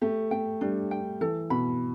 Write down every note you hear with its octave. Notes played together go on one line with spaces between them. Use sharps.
A3 G4
A3 G5
G3 D4
G5
E3 A4
B2 B5